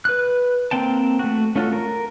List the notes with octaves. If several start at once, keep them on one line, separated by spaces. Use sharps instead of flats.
B4 F#6
A#3 C4 G5 A5
A3 F#4
A3 C#4 F4 F#4 A4
A#4